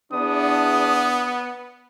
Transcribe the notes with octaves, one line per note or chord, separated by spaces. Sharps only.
E2 B3 D4 D#6